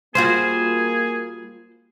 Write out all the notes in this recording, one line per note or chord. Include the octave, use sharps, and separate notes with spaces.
G3 A#3 F4 F#4 G#4 C5